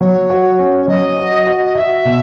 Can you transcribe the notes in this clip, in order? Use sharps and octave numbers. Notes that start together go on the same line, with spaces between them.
F#3 C#5
F#4
C#4
C#5
F#3 D#5
F#4
F#4
D#5
F#4 E5
B2